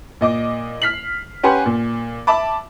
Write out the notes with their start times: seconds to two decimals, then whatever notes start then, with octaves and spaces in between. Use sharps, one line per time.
0.21 A#2 D#5 D6
0.82 F6 B6 C7 F#7
1.43 C#4 G4 B4 F#5 G#5 C6
1.66 A#2
2.27 E5 A5 B5 D6